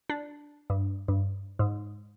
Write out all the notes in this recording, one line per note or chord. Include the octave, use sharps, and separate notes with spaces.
D4
G2
G2
G#2